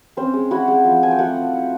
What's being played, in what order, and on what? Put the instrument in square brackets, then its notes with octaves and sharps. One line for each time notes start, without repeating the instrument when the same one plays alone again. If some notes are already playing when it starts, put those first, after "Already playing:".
[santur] C4 C#4 C5
G#3
E4 F#4 F#5
G#3
F3
F3 G#5
G5
A3 F#4 F#5
F3
E4